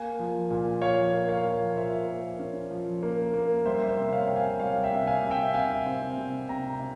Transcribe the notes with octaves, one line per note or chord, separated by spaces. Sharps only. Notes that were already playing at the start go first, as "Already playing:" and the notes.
Already playing: A#3 F5 G#5
F3
A#2
F3 C#5 F5
A#3
C#5 F5
F3
A#2 C5 E5
A#3
C#4
F3
A#3
A#3
G3 C5 E5
C5 E5
C3
C#5 F5
C3 G5
F5 G#5
G3 C#5 F5
E5 G5
C3
F5 G#5
C3
E5 G5
C3 F5 G#5
C4
C3
C3 G5 A#5
C3